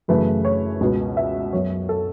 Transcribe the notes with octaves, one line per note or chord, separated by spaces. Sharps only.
F#2 C#3 E3 A3 B4
C#5
C#2 B2 B3
E5
F#2 F#3 B3 C#5
A4